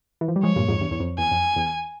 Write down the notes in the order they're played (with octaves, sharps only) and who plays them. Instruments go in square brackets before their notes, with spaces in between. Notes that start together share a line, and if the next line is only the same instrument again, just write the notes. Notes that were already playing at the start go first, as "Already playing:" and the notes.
[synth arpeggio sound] E3
F3
G3
[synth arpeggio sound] F3 G#3 [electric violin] C#5
[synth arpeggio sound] G2 A#2
F2 G#2
E2 G2
E2
F2
[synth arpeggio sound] E2 [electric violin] G#5
[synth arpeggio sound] F2
E2